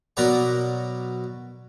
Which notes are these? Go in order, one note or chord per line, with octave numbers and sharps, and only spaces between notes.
B2 F#3 A#4 B4 D5 A#5